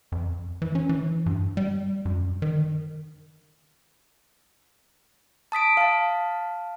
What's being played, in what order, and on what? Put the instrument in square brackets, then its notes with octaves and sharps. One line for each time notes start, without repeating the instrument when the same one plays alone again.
[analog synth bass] F2
E3
C#4
E3
G2
G3
F#2
D#3
[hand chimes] A5 D#6 B6 D7
F5 A5